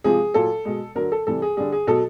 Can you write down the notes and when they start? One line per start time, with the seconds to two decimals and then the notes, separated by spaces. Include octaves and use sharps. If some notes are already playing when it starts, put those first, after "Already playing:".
0.04 C3 F3 G#3 G#4
0.34 A#2 F#3 A4
0.65 B2 G#3
0.95 D3 F#3 A#4
1.12 A4
1.27 C3 E3 G3 A4
1.42 G#4
1.57 D3 G3 G#4
1.72 G#4
1.87 B2 F#3 A4